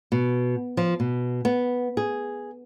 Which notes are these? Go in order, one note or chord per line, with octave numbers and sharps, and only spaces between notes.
B2
F3
B2
B3
G#4